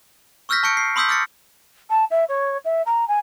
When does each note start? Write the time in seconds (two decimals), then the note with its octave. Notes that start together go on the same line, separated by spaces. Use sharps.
0.49 C#6 E6 F6 G6 A#6 B6
0.63 A5 C#6 G6 C#7 D7
0.77 C7
0.96 B5 C6 D#6 E6 G6 B6
1.09 D6 F6 A6 A#6 C#7
1.90 A5
2.11 E5
2.29 C#5
2.65 E5
2.86 A#5
3.08 G#5